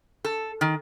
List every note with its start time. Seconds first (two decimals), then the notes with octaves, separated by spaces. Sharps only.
0.25 A4
0.61 D#3